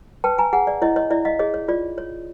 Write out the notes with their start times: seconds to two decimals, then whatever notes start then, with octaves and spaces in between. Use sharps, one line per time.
0.24 B4 G5 A5
0.38 G#5 A#5
0.53 G#4 F#5 G#5
0.67 D5
0.82 E4 C#5 D#5
0.96 C#5 D#5
1.11 E4 D5 E5
1.25 D#5 F5
1.39 G#4 C#5 D#5
1.54 C#5
1.68 F4 D5
1.98 C#5